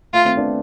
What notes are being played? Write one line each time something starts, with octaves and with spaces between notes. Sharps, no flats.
A3 F4
A3 C4
B3 D4